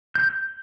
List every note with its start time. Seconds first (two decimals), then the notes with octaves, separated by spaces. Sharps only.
0.15 G6